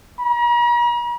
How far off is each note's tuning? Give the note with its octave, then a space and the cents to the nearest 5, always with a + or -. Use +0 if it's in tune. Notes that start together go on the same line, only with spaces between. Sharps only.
A#5 +45